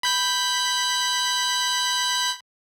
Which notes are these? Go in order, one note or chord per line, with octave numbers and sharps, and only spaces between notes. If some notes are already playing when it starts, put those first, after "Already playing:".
B5 G6 B6